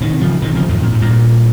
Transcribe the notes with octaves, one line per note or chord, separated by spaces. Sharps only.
C3 D#3
C#3 F3
C3 D#3
C#3 F3
F2 G#2
A#2
G#2
G2 A#2